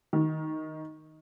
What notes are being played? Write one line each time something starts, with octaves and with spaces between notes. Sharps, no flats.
D#3